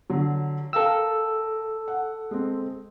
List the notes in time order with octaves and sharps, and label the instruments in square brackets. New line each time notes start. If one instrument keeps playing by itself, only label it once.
[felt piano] D3 F#3
[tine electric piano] A4 E6 [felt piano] A#4 F5 G5
[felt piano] F#5
G#3 C4